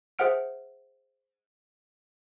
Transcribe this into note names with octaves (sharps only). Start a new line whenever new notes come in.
G#4 C5 E5 F#5 F6 D7